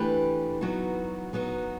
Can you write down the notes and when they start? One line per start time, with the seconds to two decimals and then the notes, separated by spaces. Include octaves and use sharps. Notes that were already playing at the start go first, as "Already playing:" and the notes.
Already playing: E3 A3 D4 G4 B4
0.61 F#3 B3 D#4 F#4
1.33 F#3 B3 D#4 F#4